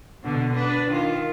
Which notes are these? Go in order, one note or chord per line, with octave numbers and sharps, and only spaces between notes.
B2 D3
D4 B4
D#3 F4